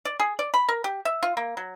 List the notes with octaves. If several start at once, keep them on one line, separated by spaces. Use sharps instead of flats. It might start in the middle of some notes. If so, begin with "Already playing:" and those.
D5
G#4
D5
B5
A#4
G4
E5
F4
A#3
F#3